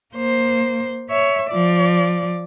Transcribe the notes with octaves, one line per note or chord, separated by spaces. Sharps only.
A#3 C5
C#5 E5
F3 D5